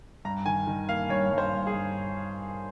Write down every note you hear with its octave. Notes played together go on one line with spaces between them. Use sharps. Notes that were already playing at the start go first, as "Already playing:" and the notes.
G2 A#5
D#3 G#5
D#3
A#3 F5
G2 C#5
G2
C5
G2
G#4
G2